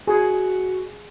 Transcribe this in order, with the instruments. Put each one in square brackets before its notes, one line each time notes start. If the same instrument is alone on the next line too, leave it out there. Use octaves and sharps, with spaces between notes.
[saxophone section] F#4 [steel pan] G#4